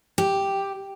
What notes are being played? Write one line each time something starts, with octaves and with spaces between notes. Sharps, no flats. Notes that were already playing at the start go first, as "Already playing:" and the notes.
G4